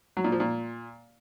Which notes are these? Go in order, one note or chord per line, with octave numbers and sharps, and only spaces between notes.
F#3
A#2
F3
A#2